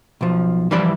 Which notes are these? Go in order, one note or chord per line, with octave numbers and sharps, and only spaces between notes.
B1 F3
E3 F3 G3 E4 B4 D5